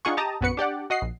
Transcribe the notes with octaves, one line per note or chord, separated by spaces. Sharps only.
D4 D#4 F4 G#4 F#5 C#6
G4 D#5 A5 A#5 D#6
A#1 F#2 B3 F#4 B4 C#7
D4 G4 D5 F#5
F#4 D#5 F#5 C7
A#1